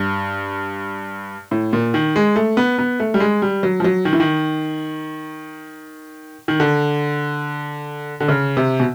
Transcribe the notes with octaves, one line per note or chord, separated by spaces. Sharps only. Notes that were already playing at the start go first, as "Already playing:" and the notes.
Already playing: G2
A2
A#2
D#3
G#3
A3
B3
B3
A3
G3
G#3
G3
F#3
F3
F#3
D#3
E3
D#3
D#3
D3
D3
C#3
C3
B2